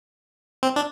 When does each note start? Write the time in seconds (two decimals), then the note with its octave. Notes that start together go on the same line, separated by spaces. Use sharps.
0.63 C4
0.76 D4